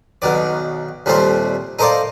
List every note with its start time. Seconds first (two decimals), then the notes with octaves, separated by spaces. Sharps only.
0.22 B1 B2 D#3 D5
1.06 D#2 A#2 G3 A3 C4 C5
1.79 D#4 A4 A#4 C5 D5 F5